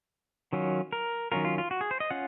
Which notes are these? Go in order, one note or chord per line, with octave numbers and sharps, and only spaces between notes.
D#3 F#3 C#4 F4
A#4
D#3 F#3 C#4 F4 A#4
F4
F4
F#4
G#4
C5
D#5
C#4 F4 F#5